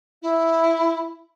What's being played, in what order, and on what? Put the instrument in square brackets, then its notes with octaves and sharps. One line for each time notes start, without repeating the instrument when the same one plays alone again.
[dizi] E4